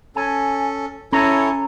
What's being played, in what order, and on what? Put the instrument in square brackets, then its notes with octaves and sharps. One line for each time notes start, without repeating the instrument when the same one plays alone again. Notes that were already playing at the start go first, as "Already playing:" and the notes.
[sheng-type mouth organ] C#4 A4 [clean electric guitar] G#5
[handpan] C#4 [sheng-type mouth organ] E4 A4 C#5 [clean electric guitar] G#5 A#5